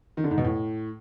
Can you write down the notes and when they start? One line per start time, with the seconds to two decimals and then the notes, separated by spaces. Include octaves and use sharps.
0.17 D#3
0.24 D3
0.31 G#2
0.38 B2
0.45 A2